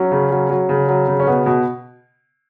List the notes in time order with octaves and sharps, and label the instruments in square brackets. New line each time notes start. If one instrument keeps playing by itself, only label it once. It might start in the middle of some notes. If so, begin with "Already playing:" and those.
Already playing: [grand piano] F#3 C#4
C#3
F#3
F#3
C#3
F#3
C#3
C#4
B2 B3
B2